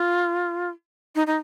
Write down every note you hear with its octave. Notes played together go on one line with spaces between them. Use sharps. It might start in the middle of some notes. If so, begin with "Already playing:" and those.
Already playing: F4
D#4
D#4